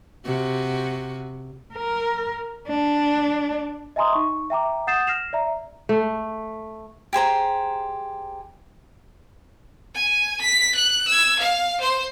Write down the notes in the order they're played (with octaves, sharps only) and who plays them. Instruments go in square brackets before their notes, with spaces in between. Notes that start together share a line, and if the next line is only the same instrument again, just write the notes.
[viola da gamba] C3 F#4
[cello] A#4
D4
[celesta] D#5 E5 G#5 A#5 C6 D#6
D#4 C#6
E5 G5 A#5 D6
F#5 D#6 G6 A6 C7 E7
F6 A#6 C7 E7 F7
D5 E5 A#5
[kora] A3
[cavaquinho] G4 G#4 C5 A#5
[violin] G#5
B6
F#6
E6 G#6
F5
C5 C6